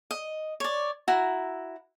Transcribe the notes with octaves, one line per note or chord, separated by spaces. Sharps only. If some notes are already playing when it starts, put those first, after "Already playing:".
D#5
C#5 D5
E4 F#4 A#5